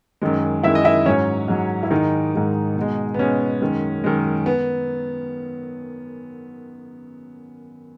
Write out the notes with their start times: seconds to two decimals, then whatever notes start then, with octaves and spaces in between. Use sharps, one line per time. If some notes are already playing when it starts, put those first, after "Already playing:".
0.22 F#2 D#3 G#3
0.64 F#2 D#3 G#3 E4 E5
0.75 D#5
0.85 E4 E5
1.06 G#2 F#3 C#4 C#5
1.48 G#2 F#3
1.83 E4
1.91 G#2 D#3 G#3 D#4
2.34 G#2 D#3 G#3
2.76 B2
2.81 G#3
3.14 B3
3.18 B2 G#3 C#4
3.61 F#2 D#3 G#3
4.04 F#2 D#3 G#3
4.46 B3